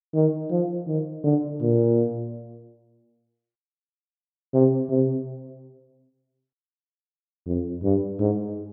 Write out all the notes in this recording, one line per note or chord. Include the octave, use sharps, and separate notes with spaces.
D#3
F3
D#3
D3
A#2
C3
C3
F2
G2
G#2